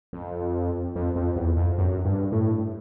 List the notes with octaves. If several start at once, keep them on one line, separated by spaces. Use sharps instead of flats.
F2
F2
F2
E2
F2
F#2
G2
A2